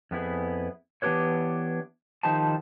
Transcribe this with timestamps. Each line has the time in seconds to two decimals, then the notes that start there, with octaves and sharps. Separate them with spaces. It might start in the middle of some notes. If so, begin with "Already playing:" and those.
0.11 F2 B3 E4 G#4
1.02 E3 B3 D4 G4 B4 C#5
2.23 D#3 F3 D#4 G4 C5 A5